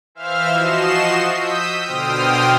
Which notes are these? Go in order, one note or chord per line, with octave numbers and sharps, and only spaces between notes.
E3 C5 E5 F5 F6
F3 F#4 D#5 C7 E7
D#6 E6 G6 B6
B2 D3 C5 G5 D#6 F6